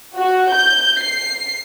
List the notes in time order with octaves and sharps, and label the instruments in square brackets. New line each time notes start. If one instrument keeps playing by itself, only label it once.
[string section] F#4
G6
C7